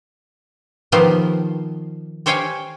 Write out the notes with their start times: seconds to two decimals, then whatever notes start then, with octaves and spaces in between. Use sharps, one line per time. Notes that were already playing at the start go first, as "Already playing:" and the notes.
0.92 D#3 F3 B3 F4 G4 C5
2.26 G4 C5 C#5 F5 G5 G#5